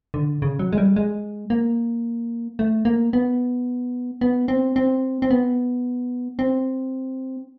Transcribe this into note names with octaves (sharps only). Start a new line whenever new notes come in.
D3
C#3
F#3
G#3
G3
G#3
A#3
A3
A#3
B3
B3
C4
C4
C4
B3
C4